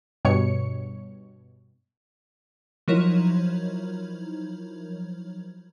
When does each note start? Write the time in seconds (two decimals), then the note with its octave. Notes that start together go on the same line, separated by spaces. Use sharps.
0.25 G2 B2 C#5 C#7
2.88 F3 F#3 D#4 E4 A#4 C#5